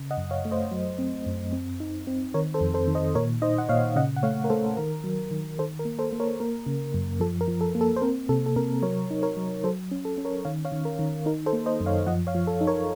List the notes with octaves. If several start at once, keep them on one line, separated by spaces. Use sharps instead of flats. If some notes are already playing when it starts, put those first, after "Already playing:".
Already playing: C#3
D#5 F#5
F#2
C#5 F5
A3
C5 D#5
F#3
C4
F#2
C4
D#4
C4
D#3 A#4 C#5
A4 C5
F2
A4 C5
D#3
C5 D#5
A#2 A#4 C#5
D#4 C5 D#5
F#5
A#2 C#5 F5
C#3 D#5 F#5
F#5
A3 C#5 F5
A#4
A3 A4 C5
D#3 A#4
F#3
D#3
D#3 A4 C5
A#4
A#3
A4 C5
A#3
A#4 C#5
A#3 A#4
C#3
F#2
F3 A4
A#4
F3
A4
A#3
A4
C5
C4 A#4
C3 A4
A4
C3 A#4
F#3 A#4 C#5
D#4
A#4 C#5
F#3
F#3 A4 C5
C#4
A4
C#4
A#4 C#5
D#3 C#5 F5
C#5 F5
D#3
A#4
D#3
D#4 A#4
A4 C5
A#3
C5 D#5
F#2
C#5 F5
F3 D#5 F#5
C#5 F5
F3
A4
D#4
A#4 C#5